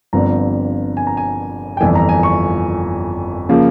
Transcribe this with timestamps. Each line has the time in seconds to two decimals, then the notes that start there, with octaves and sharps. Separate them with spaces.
0.13 G1 G2 F3 C4 A#5
0.97 G#5
1.07 A#5
1.17 G#5
1.77 G5
1.81 G1 F2 E3 G#5
1.95 A#5
2.09 G#5
2.23 C#6
3.49 C#3 F3 A#3